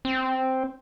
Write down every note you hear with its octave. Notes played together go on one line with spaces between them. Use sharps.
C4